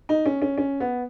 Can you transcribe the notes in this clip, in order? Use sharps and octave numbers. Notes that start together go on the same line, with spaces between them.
D#4
C#4
C#4
C#4
B3